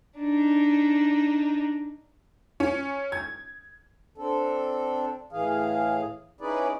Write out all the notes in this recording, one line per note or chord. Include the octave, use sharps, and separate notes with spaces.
D4 D#4
C#4
G#6
C4 D4 A4
A2 E3 G#4 F5
C#4 D#4 E4 G#4 B4 D5